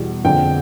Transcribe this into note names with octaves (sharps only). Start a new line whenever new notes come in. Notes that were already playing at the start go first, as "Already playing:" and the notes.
Already playing: E2 B2 G3
F2 D3 F3 G5